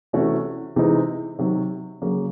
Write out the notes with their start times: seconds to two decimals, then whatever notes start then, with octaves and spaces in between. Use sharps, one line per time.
0.13 C3 E3 A3 C#4 F#4
0.76 C3 E3 G#3 C4 D#4
1.39 C3 D#3 F#3
2.02 C#3 F#3 A#3